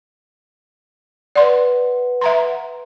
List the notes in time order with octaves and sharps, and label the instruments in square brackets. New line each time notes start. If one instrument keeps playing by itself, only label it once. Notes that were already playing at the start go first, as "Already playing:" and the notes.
[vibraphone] B4 F#5 [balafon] D5 C6
[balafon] E5 A#5 C6